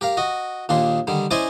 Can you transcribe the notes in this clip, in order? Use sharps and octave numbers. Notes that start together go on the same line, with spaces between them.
G4 A#4 F5
F#4 D#5
D#2 A#2 D#3 D4 C6
D3 D#3 G3
C#4 E4 C5 D5 D#5 G#5